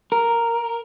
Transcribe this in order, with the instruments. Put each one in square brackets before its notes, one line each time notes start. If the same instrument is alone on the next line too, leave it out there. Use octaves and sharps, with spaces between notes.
[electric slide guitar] A#4